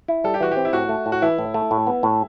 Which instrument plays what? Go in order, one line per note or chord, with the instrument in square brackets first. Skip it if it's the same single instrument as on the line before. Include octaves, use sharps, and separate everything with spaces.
[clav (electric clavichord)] E4
[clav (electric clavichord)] G3 [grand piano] A4
[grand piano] G4
[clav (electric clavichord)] E3 [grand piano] F#4
[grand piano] G4
[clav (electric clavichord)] C4
[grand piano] E4
[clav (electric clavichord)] A2 [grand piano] F#4
[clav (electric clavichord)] A3
A2
[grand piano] F#4
[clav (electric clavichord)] E3 [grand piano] E4
[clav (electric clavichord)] A2
A3
A2
B3
A2